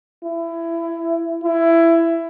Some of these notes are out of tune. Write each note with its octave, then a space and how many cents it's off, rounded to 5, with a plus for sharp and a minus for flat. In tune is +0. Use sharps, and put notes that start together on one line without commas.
E4 +20
E4 +15